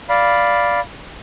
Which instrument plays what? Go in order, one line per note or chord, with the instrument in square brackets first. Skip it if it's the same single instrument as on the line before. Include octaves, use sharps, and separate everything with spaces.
[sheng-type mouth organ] D5 F5 B5